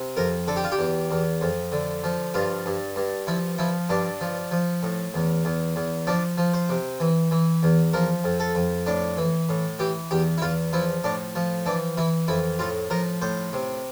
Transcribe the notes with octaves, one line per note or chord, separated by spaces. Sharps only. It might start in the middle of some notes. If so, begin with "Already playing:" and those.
Already playing: C3
F2 A#4
D3 A4
G4
F4
G4
E2
E2
F2
D3
F3
G2 F4
G2
G2
F3 E4
F3 E4
G2 D4
F3
F3
A2
E2
E2
E2
F3 D4
F3
C5
C3
E3
E3
E2
F3 A#4
F2
A4
F2
A2 D4
E3
A2
E3 G4
E2 G4
E4
E2 F4
F3 E4
A2 D4
F3
E3 D4
E3 E4
F2 E4
A2 F4
F3 A#4
A2 C5
C3